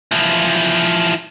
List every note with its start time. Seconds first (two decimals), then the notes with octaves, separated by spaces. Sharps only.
0.11 E3 F3